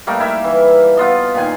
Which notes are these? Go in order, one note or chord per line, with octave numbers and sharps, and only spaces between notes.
G3 A3 A#3 D#4
E4 A#4 E5
E3
B3 F4 D#5
A#2 D#3 G#5